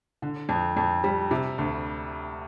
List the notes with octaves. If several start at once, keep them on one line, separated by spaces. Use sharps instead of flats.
D3
F2
F2
G3
C3
D2